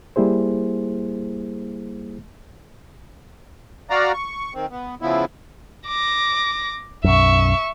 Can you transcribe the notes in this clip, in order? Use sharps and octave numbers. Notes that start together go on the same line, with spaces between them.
G3 A#3 E4 G#4 C5
F#4 D5 F5 A#5
C#6
D#3 C4
B3
C#3 F3 B3 E4
D6 A#6
B1 F#2 E5 C#6